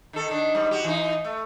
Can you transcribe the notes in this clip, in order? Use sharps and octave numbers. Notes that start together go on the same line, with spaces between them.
D#3 A4
D#3 D4
G#2 G3
F#4 G4
E3 D#4
A3